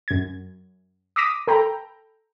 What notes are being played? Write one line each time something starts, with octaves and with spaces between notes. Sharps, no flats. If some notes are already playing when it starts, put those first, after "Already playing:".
F#2 G#6
D6 D#6 A#6 B6 D#7
A4 G5 A#5 B5